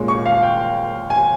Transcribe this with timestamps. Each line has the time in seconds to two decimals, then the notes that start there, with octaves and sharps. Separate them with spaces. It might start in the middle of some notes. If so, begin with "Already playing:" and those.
Already playing: A#2 G#3 C#4
0.08 C#6
0.26 F5
0.42 G5
1.10 G#5